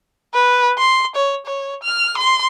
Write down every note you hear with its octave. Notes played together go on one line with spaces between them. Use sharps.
B4
C6
C#5
C#5
F6
C6